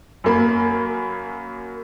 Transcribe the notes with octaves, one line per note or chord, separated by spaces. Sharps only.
F#2 A#3 B5